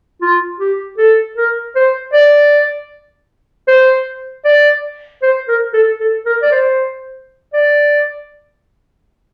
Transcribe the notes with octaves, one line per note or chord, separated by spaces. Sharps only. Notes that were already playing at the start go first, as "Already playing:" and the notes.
F4
G4
A4
A#4
C5
D5
C5
D5
C5
A#4
A4
A4
A#4
D5
C5
D5